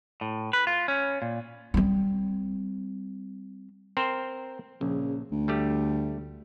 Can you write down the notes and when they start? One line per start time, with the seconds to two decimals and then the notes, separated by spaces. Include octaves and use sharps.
0.21 A2
0.53 B4
0.67 F4
0.88 C#4
1.22 A#2
1.74 G3 C4
3.97 C4 A#4 C5
4.81 A#1 C#3
5.32 D2
5.48 G3 A3 G4